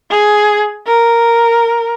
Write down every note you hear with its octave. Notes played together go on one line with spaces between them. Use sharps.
G#4
A#4